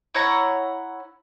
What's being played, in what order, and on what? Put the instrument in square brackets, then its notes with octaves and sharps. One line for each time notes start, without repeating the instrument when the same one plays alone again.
[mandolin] E4 C#5 F#5 A#5